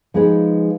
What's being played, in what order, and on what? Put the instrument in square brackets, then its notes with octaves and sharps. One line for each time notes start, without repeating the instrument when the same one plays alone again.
[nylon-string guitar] F3 G#3 D#4 G#4 B4